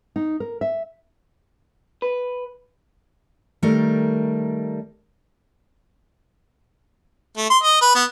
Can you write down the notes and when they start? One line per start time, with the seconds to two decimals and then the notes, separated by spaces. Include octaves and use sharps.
0.16 D#4
0.40 A#4
0.61 E5
2.02 B4
3.63 D#3 G3 A3 A#4 D5
7.37 A3
7.50 C6
7.63 D#5
7.81 B4
7.95 B3